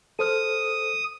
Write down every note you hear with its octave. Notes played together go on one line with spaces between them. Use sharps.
A4 C5 D#6 F6